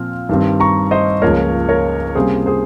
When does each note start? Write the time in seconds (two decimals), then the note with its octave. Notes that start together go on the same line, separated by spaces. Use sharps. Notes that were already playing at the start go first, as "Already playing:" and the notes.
Already playing: A#2 F3 C4 F6
0.29 G2 D#3 G3 C4
0.60 A#5 C#6
0.91 C5 D#5
1.22 C#2 C#3 F3 A#3 A#4 C#5
1.69 A#4 C#5
2.15 C3 G3 A#3 C#4 G#4 C5
2.46 G#4 C5